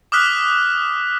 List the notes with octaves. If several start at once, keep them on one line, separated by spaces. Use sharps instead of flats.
D6 D#6 F6 F#6 B6